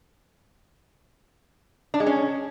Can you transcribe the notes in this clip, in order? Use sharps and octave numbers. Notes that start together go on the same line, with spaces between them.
D4
G#3
C#4